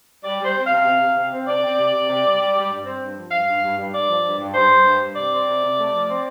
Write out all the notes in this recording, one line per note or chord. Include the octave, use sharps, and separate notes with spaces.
G3 D5
G3
C5
C4
F5
C3
C3
C3
C3
C4
C3 D5
C4
C3
C3
C3
G3
G3
G3
G2
C4
G2
F3
G2 F5
G2
G2
G2
G2 D5
F3
G2
G2
G2 C5
G2
G2
G2
C3 D5
C4
C3
C3
A3
F3
C4